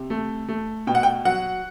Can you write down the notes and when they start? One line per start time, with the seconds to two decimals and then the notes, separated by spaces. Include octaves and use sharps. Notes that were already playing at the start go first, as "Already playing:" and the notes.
Already playing: C3
0.10 A3
0.49 A3
0.87 B2 G5
0.95 F#5
1.03 G5
1.25 F#3 F#5